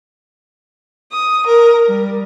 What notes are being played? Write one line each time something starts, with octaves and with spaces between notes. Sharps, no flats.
D#6
A#4
G3